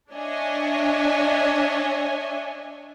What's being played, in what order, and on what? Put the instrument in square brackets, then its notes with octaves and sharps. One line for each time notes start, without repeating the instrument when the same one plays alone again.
[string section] D4 C#5 D#5 E5 G#5